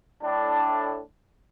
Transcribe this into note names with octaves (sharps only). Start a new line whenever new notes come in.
A2 D4